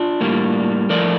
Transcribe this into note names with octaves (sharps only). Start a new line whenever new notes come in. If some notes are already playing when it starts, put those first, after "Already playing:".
Already playing: D4 F4
A2 G3 A#3
A2 F3 A3 A#4 D5